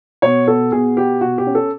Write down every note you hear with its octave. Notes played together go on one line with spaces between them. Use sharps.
B2 C#5
B3 A4
B2 G#4
B3 G4
B2 F#4
G4
C#4
A4